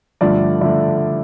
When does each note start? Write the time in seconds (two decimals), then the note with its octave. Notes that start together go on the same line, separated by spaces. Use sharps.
0.21 G2 D3 F3 A3 D5
0.61 D3 F3 A3